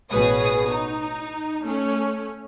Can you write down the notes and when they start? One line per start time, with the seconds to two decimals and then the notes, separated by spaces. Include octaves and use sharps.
0.10 A1 B2 G#4 B4 C#5 D#6
0.68 D#4
1.63 A3 C#4